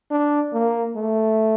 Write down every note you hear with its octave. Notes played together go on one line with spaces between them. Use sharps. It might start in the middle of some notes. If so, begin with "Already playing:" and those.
D4
A#3
A3